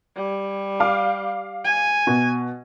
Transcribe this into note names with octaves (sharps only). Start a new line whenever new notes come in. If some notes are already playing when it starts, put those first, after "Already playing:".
G3
F5 D6
G#5
B2